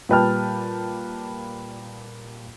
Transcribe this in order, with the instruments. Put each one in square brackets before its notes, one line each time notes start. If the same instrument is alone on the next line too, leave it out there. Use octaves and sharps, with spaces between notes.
[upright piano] A#2 G3 B4 G5 A5 F6